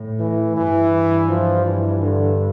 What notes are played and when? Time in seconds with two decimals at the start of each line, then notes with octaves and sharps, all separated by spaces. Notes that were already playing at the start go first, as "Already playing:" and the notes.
Already playing: A2
0.19 E3
0.56 G2 E3
1.28 F3
1.65 E3
2.01 D3